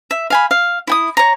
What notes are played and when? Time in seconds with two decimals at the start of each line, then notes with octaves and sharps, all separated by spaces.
0.11 E5
0.30 F5 G#5 B5
0.51 F5
0.87 E4 G5 D#6
1.17 C#5 A#5